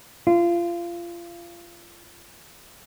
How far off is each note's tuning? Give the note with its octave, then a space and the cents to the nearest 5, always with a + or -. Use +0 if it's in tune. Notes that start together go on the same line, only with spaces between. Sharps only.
F4 -25